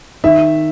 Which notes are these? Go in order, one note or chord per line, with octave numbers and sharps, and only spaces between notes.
D#3 E5